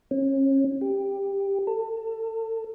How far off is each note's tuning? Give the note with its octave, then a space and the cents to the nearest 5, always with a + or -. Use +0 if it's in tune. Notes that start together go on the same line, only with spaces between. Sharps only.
C#4 -35
G4 +10
A4 +30